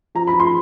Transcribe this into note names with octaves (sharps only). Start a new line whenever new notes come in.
F3 A#5
B5
F3
C6